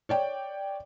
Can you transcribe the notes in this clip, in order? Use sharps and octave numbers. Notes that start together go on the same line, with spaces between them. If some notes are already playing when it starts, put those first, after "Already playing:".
C#5 D5 G5